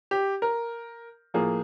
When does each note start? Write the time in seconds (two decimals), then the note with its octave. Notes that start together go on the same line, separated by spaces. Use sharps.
0.11 G4
0.42 A#4
1.34 A2 F3 A#3 G#4